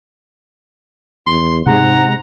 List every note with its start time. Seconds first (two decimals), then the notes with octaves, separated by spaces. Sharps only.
1.27 E2 C6
1.66 G#2 C3 G#3 F#5 A#5